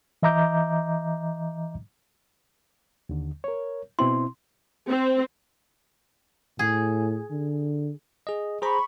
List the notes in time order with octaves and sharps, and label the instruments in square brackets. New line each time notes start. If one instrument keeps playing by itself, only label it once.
[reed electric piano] E3 D#5 E5 A#5 D6 G6
D#2 D3
A#4 C#5
[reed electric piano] B2 C4 E4 [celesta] C6
[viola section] C4
[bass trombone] A2 [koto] G#4
[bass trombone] D3
[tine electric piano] G#4 D#5
[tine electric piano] G#4 C5 A#5 [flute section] B5 C#6